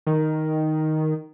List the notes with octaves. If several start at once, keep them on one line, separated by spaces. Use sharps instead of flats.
D#3